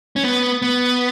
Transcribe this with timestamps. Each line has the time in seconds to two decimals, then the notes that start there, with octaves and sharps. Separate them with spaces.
0.16 C#4
0.24 B3
0.62 B3